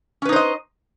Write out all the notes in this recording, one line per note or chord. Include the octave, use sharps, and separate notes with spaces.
C#4 D#4 B4 C5 D#5